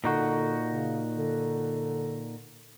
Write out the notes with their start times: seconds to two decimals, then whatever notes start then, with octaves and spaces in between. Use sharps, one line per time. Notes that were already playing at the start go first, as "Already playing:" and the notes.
0.04 A#2 D3 D#4 F#4
0.70 C#3
1.16 D3